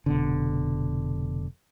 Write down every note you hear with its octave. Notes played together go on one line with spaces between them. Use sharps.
F1 B2 D3